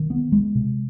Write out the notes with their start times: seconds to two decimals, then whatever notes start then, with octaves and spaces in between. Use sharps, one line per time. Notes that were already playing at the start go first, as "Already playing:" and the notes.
Already playing: D#3
0.10 B3
0.32 G#3
0.55 C3